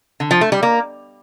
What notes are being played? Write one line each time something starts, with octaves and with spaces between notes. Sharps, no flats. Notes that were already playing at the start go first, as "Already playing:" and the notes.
D3
F3
A3
G3
A#3